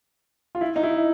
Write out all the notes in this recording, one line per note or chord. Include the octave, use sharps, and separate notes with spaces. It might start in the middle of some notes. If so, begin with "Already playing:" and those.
F4
E4
D#4
E4